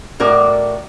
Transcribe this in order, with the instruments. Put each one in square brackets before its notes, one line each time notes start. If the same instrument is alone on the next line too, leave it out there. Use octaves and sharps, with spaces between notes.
[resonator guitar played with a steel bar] A2 F#4 A#4 D5